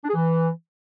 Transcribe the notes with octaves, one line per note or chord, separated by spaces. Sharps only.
D4
G#4
E3